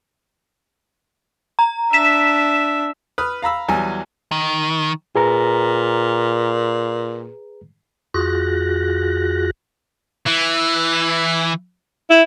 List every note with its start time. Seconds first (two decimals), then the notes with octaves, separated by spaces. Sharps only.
1.59 A#5
1.93 D4 E5 B6 E7
3.18 B4 D#6 F6
3.42 F5 A#5 B5 E6
3.68 E2 F#3 G3 G#5
4.32 D#3
5.15 A#2 G#4 B4 A#5
8.14 F2 F4 F#4 G#4 F#6 A#6
10.26 E3
12.10 E4